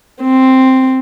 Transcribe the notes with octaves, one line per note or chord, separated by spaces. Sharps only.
C4